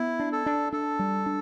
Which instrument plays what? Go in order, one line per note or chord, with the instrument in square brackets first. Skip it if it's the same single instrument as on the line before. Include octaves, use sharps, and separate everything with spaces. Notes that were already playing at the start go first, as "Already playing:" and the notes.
Already playing: [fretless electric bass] B3 [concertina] E4
[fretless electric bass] D4
[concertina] A4
[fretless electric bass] D4
[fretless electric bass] D4 [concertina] A4
[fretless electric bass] G3
D4